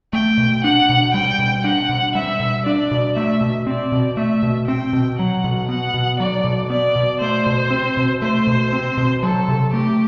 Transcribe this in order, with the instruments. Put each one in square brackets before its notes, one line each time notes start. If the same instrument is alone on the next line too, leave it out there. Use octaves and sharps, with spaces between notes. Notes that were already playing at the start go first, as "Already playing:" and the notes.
[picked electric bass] A3 [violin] G5
[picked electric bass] B2
[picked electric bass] D4 [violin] F#5
[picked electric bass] B2
[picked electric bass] G3 [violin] G5
[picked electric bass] B2
[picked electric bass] D4 [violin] F#5
[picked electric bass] B2
[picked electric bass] G3 [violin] E5
[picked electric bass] B2
[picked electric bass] D4 [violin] D5
[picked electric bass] B2
[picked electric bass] A3 [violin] E5
[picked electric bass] B2
[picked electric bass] C4 [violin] D5
[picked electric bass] B2
[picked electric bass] A3 [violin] E5
[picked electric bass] B2
[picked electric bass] C4 [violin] G5
[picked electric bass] B2
[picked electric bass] F#3 [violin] F#5
[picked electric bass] B2
[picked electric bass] B3 [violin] F#5
[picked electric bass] B2
[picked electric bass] F#3 [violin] D5
[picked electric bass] B2
[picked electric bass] B3 [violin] D5
[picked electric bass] B2
[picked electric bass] A3 [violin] C5
[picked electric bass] B2
C4
B2
[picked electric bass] A3 [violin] C5
[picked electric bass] B2
C4
B2
[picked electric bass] F#3 [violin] A4
[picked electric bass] C3
[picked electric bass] A3 [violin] G4